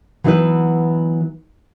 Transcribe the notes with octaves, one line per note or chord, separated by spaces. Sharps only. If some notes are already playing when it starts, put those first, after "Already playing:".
E3 F#3 B3 D#4 E4 B4